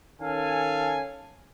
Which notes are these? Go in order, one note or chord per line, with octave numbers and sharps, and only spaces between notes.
D#3 C#4 A4 F5 G#5